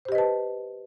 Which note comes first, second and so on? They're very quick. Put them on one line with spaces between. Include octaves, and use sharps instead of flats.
C5 G4 D#5 B4 A5